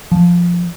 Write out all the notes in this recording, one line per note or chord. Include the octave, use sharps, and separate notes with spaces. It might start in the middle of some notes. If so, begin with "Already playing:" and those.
F3